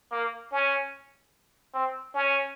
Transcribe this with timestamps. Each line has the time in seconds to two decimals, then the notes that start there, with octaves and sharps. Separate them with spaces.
0.12 A#3
0.52 C#4
1.74 C4
2.14 C#4